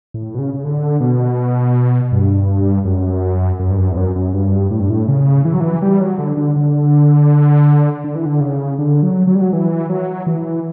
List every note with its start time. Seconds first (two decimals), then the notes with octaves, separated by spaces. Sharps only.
0.14 A2
0.35 B2
0.39 C#3
0.54 C#3
0.64 D3
1.00 B2
2.12 G2
2.85 F#2
3.59 F#2
3.70 G2
3.78 F#2
3.92 E2
3.97 F#2
4.16 F#2
4.34 G2
4.71 A2
4.80 G2
4.90 A2
5.08 C#3
5.45 E3
5.53 F#3
5.60 E3
5.82 G3
6.00 F#3
6.18 D3
6.37 D3
6.56 D3
8.04 D3
8.15 E3
8.25 D3
8.41 C#3
8.79 D3
9.03 F#3
9.27 F#3
9.35 G3
9.41 F#3
9.53 E3
9.89 F#3
10.27 E3